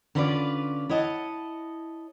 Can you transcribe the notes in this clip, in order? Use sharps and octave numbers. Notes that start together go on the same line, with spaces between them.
D3 C#4 E4 F4 B4 D5
E4 C#5 D#5 F#5 A5